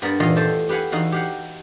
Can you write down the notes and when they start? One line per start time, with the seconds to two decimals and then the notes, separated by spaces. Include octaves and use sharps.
0.02 G2 B3 A#4 D5 B5
0.20 E2 A#2 D#3 F4 D#5 F5
0.36 A3 G4 C5 A5
0.69 G4 B4 F5 F#5 G#5
0.92 E2 D#4 F#4 F5
1.12 G4 F5 F#5